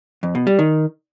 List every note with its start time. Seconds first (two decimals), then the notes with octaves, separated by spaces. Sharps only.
0.23 F2
0.35 B2
0.47 G3
0.59 D#3